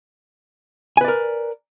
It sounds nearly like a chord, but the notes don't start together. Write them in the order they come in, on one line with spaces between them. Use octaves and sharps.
G#5 B4 D5 A#4